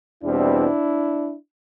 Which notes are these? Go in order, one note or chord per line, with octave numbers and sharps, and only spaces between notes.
E2 B2 G3 C4 D4 E4